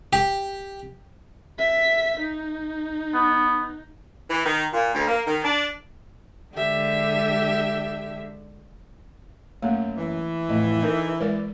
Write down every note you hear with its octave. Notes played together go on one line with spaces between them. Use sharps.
G4
E5 B6
D#4
B3
E3
D#3
A#2
D2
A#3
D#3
D4
D3 G#3 G4 E5
F#2 A3 A#3
E3
F2 A2 E4 D#5
D#4 A4 A#4
G#3 A#4 B4 D5